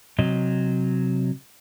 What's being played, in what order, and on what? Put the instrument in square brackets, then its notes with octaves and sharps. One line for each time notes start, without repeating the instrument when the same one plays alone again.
[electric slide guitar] C3 F#3 D#5